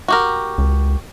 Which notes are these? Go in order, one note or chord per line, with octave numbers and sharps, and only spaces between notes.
F#4 G4 A#4
C#2